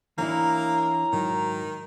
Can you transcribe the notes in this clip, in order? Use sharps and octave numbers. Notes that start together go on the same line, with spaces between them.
E3 A#3 D4 E4 C#5 A#5
G#2 D#3 F#3